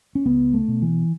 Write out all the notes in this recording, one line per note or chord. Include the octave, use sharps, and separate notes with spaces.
C#4
C#2 B3
A3
B2
E3